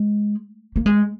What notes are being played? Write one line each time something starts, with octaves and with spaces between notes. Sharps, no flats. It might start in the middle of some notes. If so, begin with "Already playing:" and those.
Already playing: G#3
A#3
G#3